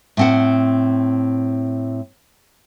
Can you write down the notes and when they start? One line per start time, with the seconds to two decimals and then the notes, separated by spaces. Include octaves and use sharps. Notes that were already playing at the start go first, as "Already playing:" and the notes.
0.17 A2 C4 F#5